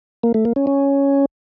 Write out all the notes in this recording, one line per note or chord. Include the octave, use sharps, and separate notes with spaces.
A#3
A3
A#3
C#4
C#4